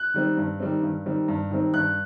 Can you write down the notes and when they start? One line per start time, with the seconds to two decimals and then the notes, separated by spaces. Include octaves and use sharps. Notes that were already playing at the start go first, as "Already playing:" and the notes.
Already playing: F#6
0.14 D#3 G3 C4
0.37 G2
0.60 D#3 G3 C4
0.82 G2
1.06 D#3 G3 C4
1.28 G2
1.51 D#3 G3 C4
1.74 G2 F#6